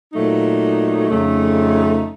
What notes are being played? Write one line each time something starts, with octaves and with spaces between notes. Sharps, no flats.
A#2 F#3 A3 D#4
F2 C#3 A3 D#4